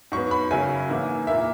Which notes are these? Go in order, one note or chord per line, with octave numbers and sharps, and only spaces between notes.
G#2 F#3 B3 C#6
B5
F#2 C#3 F#3 C#4 G#5
G#2 E3 A#3 E4
A#2 A#3 E4 E5